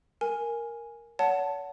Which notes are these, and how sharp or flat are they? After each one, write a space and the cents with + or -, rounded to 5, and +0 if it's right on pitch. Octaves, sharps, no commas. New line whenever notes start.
A#4 +0 G#5 +0
C#5 +40 F#5 +0 A5 +0